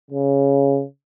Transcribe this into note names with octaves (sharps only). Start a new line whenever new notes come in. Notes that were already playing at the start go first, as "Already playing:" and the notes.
C#3